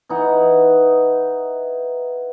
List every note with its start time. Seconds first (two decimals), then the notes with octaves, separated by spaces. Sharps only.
0.09 E3 D#4 F#5